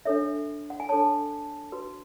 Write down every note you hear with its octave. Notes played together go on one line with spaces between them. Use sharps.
D4 A4 C#5 E5
F#5
G#5
D4 A4 C#5 A5
F#4 B4